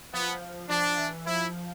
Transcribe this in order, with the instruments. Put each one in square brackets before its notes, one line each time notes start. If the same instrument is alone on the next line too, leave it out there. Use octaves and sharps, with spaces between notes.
[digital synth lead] F3 [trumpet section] B3
[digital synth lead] F3 [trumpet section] D4
[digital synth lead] E3
[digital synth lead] F3 [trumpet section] E4